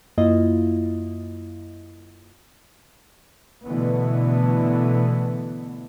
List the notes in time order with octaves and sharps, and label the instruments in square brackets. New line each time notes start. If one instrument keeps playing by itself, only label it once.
[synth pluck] F#2 A#3 E4 F4 D#5
[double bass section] B2 D3 E3 A3 B3